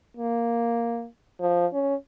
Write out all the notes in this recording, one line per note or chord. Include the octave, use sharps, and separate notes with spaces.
A#3
F3
C#4